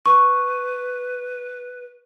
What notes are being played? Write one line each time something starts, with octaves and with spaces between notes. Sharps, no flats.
B4 C#6